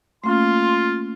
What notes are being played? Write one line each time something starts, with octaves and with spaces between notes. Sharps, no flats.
A3 A#3 C#4 F4 C6